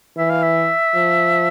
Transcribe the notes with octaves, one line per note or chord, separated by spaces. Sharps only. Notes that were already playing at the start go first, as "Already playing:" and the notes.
E3 E5
F5
E5
F3